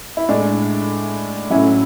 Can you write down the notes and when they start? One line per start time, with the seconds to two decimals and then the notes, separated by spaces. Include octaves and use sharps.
0.17 E4
0.29 A2 G#3 D4
1.50 A2 F#3 C#4 E4